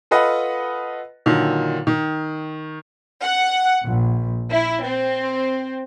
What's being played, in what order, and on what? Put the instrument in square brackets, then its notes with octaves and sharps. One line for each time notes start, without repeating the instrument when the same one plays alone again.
[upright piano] F4 A4 B4 D#5 F#5
A#2 D3 D#3 F#3
D#3
[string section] F#5
A#1
E4
C4